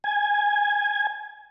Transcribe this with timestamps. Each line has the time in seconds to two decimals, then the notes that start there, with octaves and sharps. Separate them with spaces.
0.04 G#5